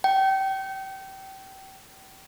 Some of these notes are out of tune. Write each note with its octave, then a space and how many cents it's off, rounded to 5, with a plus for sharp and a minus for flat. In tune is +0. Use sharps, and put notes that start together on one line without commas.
G5 -30